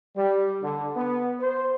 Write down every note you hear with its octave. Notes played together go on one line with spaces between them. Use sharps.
G3
D3
B3
C5